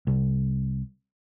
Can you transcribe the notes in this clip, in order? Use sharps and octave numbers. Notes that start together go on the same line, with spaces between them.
C2